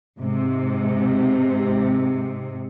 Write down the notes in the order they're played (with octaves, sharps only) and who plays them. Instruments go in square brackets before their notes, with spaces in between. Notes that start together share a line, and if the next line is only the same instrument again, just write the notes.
[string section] G#2 C3